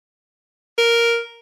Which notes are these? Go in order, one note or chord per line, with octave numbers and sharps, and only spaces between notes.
A#4